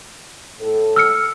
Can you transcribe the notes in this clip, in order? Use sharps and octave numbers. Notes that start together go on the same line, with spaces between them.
A2 A4
E6 F6 C#7